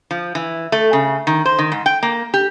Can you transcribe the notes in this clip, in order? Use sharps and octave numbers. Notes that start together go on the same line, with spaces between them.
F3
E3
A3
C#3
D#3
C5
D#3
G#2
G5
A#3
G4